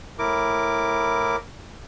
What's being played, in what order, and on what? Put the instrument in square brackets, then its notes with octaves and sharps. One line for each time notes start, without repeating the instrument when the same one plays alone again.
[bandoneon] A2 E4 A#4 D6